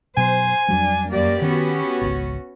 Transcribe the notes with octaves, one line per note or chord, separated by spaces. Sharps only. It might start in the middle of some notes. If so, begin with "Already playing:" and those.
B2 F#3 C5 G#5
F2 F#3 G3 D4
F#2 A#3 G4 D5
D#3 B3 C#4 F#4
G#1 C#2